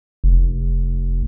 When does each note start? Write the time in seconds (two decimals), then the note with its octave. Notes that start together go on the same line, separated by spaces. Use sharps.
0.24 F1